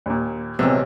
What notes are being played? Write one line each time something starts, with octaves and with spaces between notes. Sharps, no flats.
D#2 A#2
A#1 C3 E3 F#3 G#3 B3 C4 E6